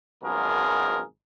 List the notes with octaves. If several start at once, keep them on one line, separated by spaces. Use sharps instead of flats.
G#1 F#2 B2 F3 G#4 A#4